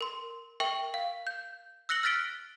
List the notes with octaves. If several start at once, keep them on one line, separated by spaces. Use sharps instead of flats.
A#4 C6
A#4 E5 G5 C#6 F#7
F5
G6
E6 F#6 A#6 C#7 F#7 G7
F6 F#6 A6 B6 D7 G7